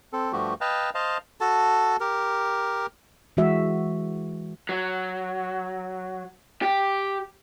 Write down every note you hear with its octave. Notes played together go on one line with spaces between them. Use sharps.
C4 A4
G2 F3 A3 F#4 G4
B4 D#5 F5 G5 A5
C5 D#5 F5 A5
F#4 A4 A5
G4 A#4
E3 G#3 F#4 E5
F#3
G4